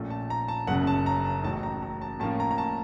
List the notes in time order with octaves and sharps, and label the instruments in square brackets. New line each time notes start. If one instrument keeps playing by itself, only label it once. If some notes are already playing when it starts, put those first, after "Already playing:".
Already playing: [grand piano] A#1 A#2 A3 C#4
A5
A#5
A5
F#1 F#5
F#2 C#3
A5
A#5
A5
A1 A2 F#3 A5
A#5
A#5
A5
A2 F3 A#3 C#4 A5
A#5
A#5
A5